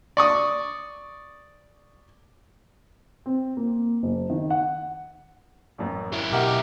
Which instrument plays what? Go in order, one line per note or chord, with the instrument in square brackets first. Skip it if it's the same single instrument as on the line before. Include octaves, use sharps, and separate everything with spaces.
[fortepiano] D5 C#6 D#6
[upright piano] C4
A#3
F#1
D#3
F#5
[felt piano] A1 F#2
[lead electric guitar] F#3 E4
[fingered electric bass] B2 [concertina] G4 A#4 [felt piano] D#5 E5 F#5